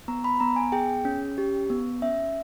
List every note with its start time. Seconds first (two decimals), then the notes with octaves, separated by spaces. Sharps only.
0.08 B3 A#5
0.24 B5
0.40 B3 A#5
0.56 G#5
0.72 G#4 G5
1.05 C#4
1.38 G4
1.70 B3
2.02 C#4 E5